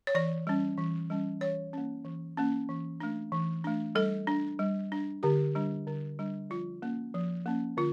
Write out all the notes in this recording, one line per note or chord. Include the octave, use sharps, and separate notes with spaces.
C#5
E3 D5
G3 C#4
E3
G3 C#4
E3 C#5
A#3 C#4
E3
A#3 C#4
E3
A3 D4
E3
A3 D4
G3 A4
D4
G3
D4
D3 G4
G3 D4
D3
G3 D4
F3 F4
A#3 C#4
F3
A#3 C#4
D3 F4